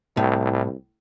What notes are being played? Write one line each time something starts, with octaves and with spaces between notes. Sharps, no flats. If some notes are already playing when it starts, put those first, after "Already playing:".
C2 A2